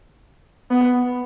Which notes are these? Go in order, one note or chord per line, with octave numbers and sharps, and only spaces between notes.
B3